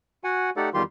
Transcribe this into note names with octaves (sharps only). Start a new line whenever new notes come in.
F#4 F#5 G#5
A3 D#4 G4 A4 D5 F#5
E2 D#3 G3 F4 G4 C6